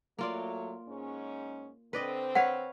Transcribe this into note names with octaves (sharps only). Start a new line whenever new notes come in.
F#3 A3 A#3 F4 D5
G#2 C#4
D3 C4 B4 D5 D#5
B4 C#5 F5 F#5